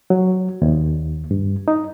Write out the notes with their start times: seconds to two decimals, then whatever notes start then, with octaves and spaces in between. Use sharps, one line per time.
0.10 F#3
0.62 D#2
1.31 G2
1.68 D#4